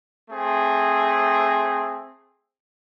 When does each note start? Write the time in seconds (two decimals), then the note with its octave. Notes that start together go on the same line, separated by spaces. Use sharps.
0.30 A3 C4 G#4